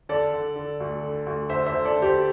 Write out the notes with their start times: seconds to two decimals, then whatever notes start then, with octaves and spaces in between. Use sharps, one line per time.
0.09 D3 A4 D5
0.33 D3
0.56 D3
0.80 D2
1.03 D3
1.27 D2
1.49 D3 C5 E5
1.67 C5 E5
1.74 D3
1.84 A4 D5
1.96 D3
2.02 G4 C5